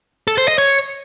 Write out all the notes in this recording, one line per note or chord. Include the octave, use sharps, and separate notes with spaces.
A4
C5
D#5
C#5